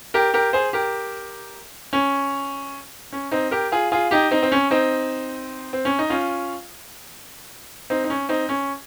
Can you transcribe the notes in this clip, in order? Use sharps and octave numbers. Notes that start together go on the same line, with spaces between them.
G4 A#4
G4 A#4
G#4 C5
G4 A#4
C#4
C#4
C4 D#4
G4 A#4
F4 G#4
F4 G#4
D#4 G4
C4 D#4
C4
C#4
C4 D#4
C4
C#4
D#4
C#4 F4
C4 D#4
D#4
C#4
C4 D#4
C#4